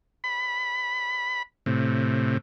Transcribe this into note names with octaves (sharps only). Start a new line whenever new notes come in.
B5
A2 C3